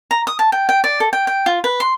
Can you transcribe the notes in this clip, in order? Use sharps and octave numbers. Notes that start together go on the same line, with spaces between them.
A#5
D#6
A5
G5
G5
D5
A4
G5
G5
F4
B4
C6